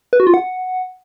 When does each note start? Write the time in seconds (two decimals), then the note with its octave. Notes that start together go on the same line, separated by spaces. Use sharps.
0.13 B4
0.20 F#4
0.27 F4
0.34 F#5